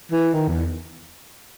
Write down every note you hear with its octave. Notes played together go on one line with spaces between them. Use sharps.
E3
D#3
E2